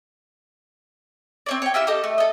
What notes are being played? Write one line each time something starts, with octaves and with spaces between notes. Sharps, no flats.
C4 C#5 D5
C#5 G5
E4 F4 G4 E6
G4 A4 D#5
A3
A4 D#5